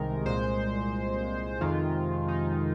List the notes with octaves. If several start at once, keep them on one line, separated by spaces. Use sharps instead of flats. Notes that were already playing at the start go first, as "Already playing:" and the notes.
Already playing: C2 C3 D#3 G#3 A#4
C2 A#2 G#3 C5
F2 C3 D#3 G#3 F4
D#4